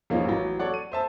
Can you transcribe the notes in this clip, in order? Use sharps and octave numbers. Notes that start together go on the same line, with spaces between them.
E2 E3 F3 A#3 C#4 D#4
A1 E3 F#3
A4 C#5 D5 F#5
D#7
C5 E5 A5